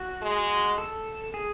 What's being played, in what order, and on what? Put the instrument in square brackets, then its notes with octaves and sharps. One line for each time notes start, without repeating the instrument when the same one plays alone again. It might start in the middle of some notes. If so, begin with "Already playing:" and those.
Already playing: [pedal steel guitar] F#4
[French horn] G#3
[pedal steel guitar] A4
G#4